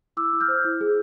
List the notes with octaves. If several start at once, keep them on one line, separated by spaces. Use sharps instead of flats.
E4 D6 E6
E4
F6 G6
C5
E4
G#4